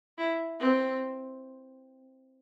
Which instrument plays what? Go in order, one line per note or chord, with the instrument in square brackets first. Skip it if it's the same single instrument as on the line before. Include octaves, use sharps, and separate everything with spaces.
[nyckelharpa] E4
C4